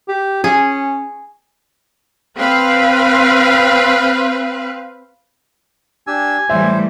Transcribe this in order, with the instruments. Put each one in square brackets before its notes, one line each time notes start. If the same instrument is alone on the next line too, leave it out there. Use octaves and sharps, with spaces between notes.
[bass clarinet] G4
[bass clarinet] C#4 [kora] G#4
[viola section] C4 B4 F5
[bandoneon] D4 G4 E6 [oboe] G#5
[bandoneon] A2 C5 [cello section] E3 G3 A3 [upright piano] E5